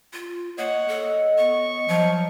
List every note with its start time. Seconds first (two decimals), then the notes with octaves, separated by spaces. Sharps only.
0.13 F4
0.58 A#3 C#5 D#5 F#5
0.88 A4
1.38 B3 C#6
1.88 F3 F#3